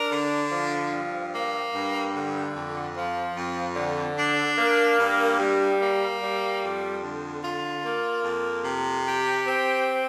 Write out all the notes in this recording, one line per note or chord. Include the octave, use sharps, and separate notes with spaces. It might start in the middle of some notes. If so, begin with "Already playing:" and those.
Already playing: D4 A#4
D3
F3
G2
A#3
G2
D3
F2
F3
F2
D3
D4
A#3
G2
G3
A#3
G3
F2
D3
F4
A#3
F2
C3
G4
C4